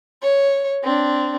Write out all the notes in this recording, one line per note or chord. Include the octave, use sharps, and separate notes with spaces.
C#5
C4 D4